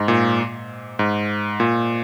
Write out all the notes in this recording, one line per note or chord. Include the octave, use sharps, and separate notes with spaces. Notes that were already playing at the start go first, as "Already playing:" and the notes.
Already playing: G#2
A#2
G#2
A#2